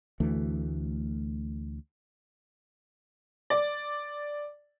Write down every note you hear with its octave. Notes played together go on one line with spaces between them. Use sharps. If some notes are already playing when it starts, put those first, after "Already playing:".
D2 E3 A3
D5